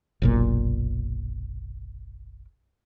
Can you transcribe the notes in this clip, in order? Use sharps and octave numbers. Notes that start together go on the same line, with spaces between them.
F#1 B1 A#2